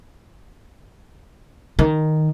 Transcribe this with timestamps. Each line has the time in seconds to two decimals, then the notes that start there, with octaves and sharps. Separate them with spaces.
1.79 D#3